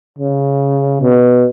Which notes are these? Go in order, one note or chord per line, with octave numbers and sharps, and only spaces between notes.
C#3
B2